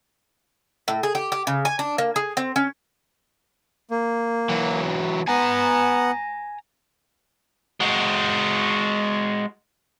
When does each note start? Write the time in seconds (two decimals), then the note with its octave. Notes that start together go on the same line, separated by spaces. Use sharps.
0.88 A2
1.03 G#4
1.15 G4
1.32 G4
1.47 C#3
1.65 G#5
1.79 D4
1.98 A#3
2.16 G#4
2.37 C4
2.56 C#4
3.91 A#3
4.49 E3 F#3
5.28 B3 F#5 G#5 A#5
7.80 G#3 F#4